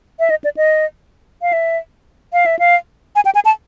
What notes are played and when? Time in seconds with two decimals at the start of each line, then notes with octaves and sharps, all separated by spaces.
0.19 E5
0.30 D#5
0.44 D5
0.57 D#5
1.42 F5
1.53 E5
2.33 F5
2.46 E5
2.59 F5
3.16 G#5
3.25 G5
3.35 G#5
3.45 A5